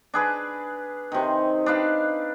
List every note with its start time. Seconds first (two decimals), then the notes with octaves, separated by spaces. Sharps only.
0.14 D4 G#4 B4
1.12 C3 D#3
1.66 D4 D#4 B4 F5